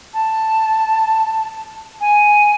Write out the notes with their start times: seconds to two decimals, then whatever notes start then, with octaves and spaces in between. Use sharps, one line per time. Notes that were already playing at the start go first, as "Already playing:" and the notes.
0.13 A5
2.00 G#5